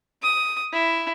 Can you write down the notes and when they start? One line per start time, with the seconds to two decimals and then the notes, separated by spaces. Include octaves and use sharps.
0.22 D#6
0.73 E4